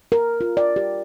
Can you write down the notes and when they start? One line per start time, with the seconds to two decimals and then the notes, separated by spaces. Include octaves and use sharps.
0.12 A#4
0.41 F4
0.57 D5
0.76 G4